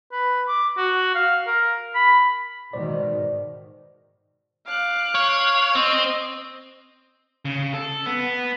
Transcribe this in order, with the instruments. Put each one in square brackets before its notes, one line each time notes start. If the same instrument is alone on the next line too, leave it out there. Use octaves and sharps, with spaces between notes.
[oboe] B4
D6
F#4
F5
A#4
B5
[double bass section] G#2 B2 D#3 [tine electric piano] C5 D5
[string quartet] F5 D6 F#6
[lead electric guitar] C#5
[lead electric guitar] C4 [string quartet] D#5
[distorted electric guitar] C#3
A4
B3